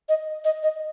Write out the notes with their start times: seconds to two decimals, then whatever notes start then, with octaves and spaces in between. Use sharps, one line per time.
0.09 D#5
0.44 D#5
0.63 D#5